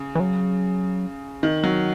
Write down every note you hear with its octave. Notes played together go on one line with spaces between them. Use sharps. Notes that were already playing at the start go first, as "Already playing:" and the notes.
Already playing: C#3
E3
F#3
D#3
F#3